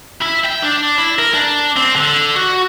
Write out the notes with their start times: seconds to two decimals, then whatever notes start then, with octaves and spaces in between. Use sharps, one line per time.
0.21 E4
0.44 G5
0.62 D4
0.98 E4
1.19 A#4
1.34 D4
1.77 C4
1.96 D3
2.36 F#4